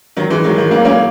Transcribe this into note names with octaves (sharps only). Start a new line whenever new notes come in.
D#3 F#3
E3 G#3
D#3 F#3
D#3 F#3
F#3 A#3
A#3 C#4